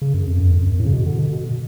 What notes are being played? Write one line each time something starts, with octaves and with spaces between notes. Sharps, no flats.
C#3
F#2
F2
F#2
F2
F#2
A2
C#3
B2
D3
B2
B2